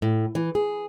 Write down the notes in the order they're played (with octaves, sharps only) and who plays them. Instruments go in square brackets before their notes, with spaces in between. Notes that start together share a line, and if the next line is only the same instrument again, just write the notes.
[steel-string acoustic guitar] A2
E3
G#4